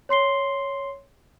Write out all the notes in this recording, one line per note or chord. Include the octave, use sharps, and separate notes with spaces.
C#5 C6 C7 G7